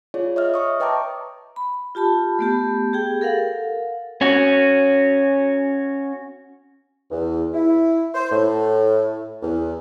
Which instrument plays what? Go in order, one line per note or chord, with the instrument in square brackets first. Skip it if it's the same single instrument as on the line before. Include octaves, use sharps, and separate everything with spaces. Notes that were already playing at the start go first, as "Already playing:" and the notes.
[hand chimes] F4 G#4 C#5 D5
C#5 D#5 E5 F6
E5 C#6 D#6
B4 D#5 G5 A5 A#5 D6
[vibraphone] B5
F4 G4 A5 B5
A3 B3 G4
G4 G#4 G5
A4 A#4 F5 F#5
[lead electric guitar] C#4 F#4
[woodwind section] E2
E4
C5
A2
E2